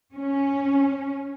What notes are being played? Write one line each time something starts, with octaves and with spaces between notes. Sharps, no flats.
C#4